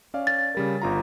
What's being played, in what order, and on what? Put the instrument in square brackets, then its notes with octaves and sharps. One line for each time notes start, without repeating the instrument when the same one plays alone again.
[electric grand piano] C#4 D5 F5
[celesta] A6
[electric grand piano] C#3 G3 A#4
G1 F4 A#5